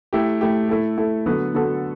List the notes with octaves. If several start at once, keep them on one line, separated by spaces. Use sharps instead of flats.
A3 E4 G4
A3 E4 G4
A3 E4 A4
A3 E4 A4
D3 F#3 B3 F#4 A4
D3 F#3 B3 F#4 A4